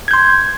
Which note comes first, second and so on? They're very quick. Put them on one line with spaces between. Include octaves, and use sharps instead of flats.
G#6 G6 C6